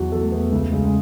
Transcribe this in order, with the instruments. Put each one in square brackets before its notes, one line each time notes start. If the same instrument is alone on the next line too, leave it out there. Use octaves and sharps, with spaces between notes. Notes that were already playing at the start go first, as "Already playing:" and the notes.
Already playing: [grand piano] E2 F#3 F#4
E2 A4
A3
E2 B3
C#2 A3
C#3 G#3
G#3